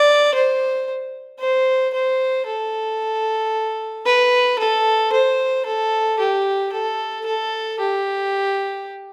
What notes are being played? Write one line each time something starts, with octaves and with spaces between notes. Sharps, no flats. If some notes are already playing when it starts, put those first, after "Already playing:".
Already playing: D5
C5
C5
C5
A4
B4
A4
C5
A4
G4
A4
A4
G4